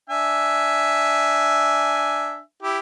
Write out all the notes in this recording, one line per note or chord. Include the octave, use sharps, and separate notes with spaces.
D4 E5 G#5
E4 G4